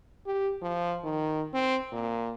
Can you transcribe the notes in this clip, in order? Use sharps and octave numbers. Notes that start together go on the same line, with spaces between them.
G4
F3
D#3
C4
A#2